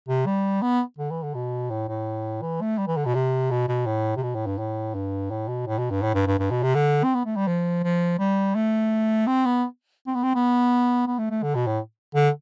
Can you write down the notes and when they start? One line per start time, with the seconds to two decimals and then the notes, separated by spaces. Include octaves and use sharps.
0.09 C3
0.26 G3
0.62 B3
0.98 D3
1.11 E3
1.23 D3
1.34 B2
1.70 A2
1.88 A2
2.42 E3
2.61 A3
2.78 G3
2.87 E3
2.97 D3
3.05 B2
3.15 C3
3.51 B2
3.68 B2
3.86 A2
4.17 C3
4.23 B2
4.35 A2
4.47 G2
4.58 A2
4.95 G2
5.31 A2
5.48 B2
5.67 A2
5.78 B2
5.90 G2
6.02 A2
6.14 G2
6.26 G2
6.39 G2
6.51 B2
6.63 C3
6.75 D3
7.04 C4
7.14 B3
7.25 A3
7.36 G3
7.47 F3
7.83 F3
8.19 G3
8.55 A3
9.27 C4
9.45 B3
10.07 C4
10.15 B3
10.23 C4
10.35 B3
11.07 B3
11.18 A3
11.30 A3
11.43 D3
11.55 B2
11.67 A2
12.15 D3